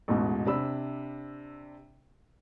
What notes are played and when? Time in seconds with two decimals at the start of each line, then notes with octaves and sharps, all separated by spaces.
0.08 A1 E2 G#2 B2
0.46 C3 D4 B5 E6